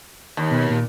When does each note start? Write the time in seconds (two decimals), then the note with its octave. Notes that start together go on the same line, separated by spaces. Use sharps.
0.37 D#2
0.51 B2
0.70 A#2